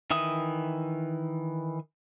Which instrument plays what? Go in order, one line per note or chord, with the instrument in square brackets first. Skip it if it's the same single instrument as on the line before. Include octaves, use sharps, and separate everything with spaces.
[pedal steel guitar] D#3 E3 E5 D#6